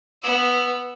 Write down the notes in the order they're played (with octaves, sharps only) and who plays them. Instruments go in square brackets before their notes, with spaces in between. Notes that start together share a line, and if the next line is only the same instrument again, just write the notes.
[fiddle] B3 E6